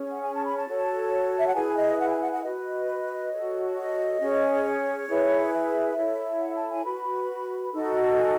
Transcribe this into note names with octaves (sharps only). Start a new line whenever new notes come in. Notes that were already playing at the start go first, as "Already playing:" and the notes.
Already playing: C#4 G#4 C#5
F#5
G#5
A5
B5
A5
F#4 A4 C#5
E5
F#5
E4 G#4 B4 G#5
D#5
F#5
G#5
F#5
F#5
F#4 B4 D#5
F#4 A4 C#5
D#5
C#4 G#4 C#5
C#5
E4 G#4 B4
E5
E4 A4 C#5
F#5
A5
G#5
F#4 B4 B5
D#4 F#4 A4
G#5